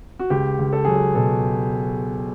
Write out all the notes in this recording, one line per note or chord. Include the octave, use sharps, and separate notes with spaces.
F#4
C#2 G4
C#2
A4
F#3 G#4
A4
B2 A4